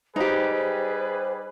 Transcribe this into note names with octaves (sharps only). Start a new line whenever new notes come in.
G3 D#4 G4 G#4 B4 C5